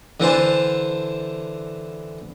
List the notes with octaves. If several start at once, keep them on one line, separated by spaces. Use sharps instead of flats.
D3 E3 C5 A5